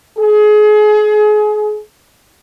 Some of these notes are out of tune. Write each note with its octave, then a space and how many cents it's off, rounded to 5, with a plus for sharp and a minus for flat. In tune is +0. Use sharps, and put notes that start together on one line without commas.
G#4 +30